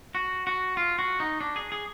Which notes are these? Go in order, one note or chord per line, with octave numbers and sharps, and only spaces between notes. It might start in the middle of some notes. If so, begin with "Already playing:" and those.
F#4
F#4
F4
F#4
D#4
D4
G#4
G#4